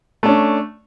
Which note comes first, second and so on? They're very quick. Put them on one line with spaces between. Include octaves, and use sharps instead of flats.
A3 D4 C#4